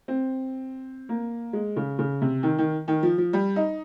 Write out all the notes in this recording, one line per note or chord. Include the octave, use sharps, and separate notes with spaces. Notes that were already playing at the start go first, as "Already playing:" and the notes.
C4
A#3
G#3
C#3
C#3
C3
D#3
D#3
D#3
F3
F3
G3
D#4